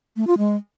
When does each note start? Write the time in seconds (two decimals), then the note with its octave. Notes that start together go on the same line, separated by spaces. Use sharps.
0.16 A3
0.27 F4
0.38 G#3